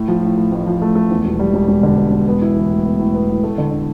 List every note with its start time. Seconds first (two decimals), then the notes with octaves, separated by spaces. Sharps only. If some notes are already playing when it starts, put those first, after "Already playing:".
Already playing: A2
0.08 F3
0.23 A2
0.37 A2
0.52 A1
0.67 F3
0.82 A3
0.95 A3
1.11 E2
1.25 E1
1.39 G3
1.54 E1
1.68 E1
1.83 D3
1.97 E1
2.12 E1
2.27 B3
2.42 E4
2.56 E3
2.70 A2
2.85 B3
2.99 A2
3.14 B3
3.29 A2
3.43 A3
3.58 D3
3.72 D3